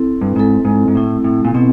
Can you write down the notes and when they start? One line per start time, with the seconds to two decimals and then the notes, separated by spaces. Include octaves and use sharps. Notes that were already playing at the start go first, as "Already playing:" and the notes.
Already playing: C4 E4 A4
0.21 G2
0.35 G#2 C4 E4 A4
0.65 G#2
0.88 G#2
0.95 A2 C4 E4 A4
1.24 A2
1.45 A#2
1.54 B2 C4 E4